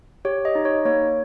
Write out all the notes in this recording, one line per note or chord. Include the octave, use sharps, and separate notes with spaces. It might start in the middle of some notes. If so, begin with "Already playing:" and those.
G4 C#5
D#5
D#4
C#5
A#3 C#5